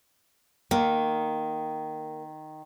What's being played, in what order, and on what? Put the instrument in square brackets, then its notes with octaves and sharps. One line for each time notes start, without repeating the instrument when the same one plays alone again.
[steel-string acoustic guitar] D#3 [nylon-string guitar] A#3